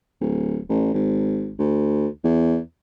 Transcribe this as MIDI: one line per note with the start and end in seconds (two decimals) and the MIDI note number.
0.21 0.58 26
0.69 0.90 33
0.94 1.53 32
1.59 2.07 38
2.24 2.58 40